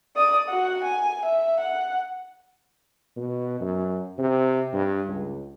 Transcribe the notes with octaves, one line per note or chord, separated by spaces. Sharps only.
D5 D#6
F#4 F#5
G#5
E5
F#5
B2
F#2
C3
G2
C#2